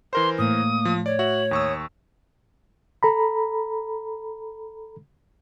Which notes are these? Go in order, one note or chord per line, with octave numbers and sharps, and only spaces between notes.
E3 A#4 C5 C6
A2 A#3 D#6
F3
C#5 D5
F#4 E5 F#7
D#2 C#6 D#6 E6
A4 A#5 B5